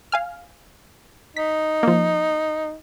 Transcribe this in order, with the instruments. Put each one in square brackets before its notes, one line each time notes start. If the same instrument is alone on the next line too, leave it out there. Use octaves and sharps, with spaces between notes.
[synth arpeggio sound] F5 G#5 F6
[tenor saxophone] D#4 [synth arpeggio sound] B6
[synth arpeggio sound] F3 A#3